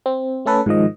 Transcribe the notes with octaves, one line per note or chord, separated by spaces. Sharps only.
C4
A3 C#4 A4 B4
G#2 D#3 F3 D#5